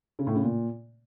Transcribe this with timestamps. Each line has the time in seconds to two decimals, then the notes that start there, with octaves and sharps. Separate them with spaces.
0.19 C#3
0.27 A2
0.35 C#3
0.43 A#2